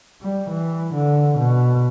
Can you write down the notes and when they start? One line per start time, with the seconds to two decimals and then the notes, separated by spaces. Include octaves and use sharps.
0.21 G3
0.50 E3
0.94 D3
1.38 B2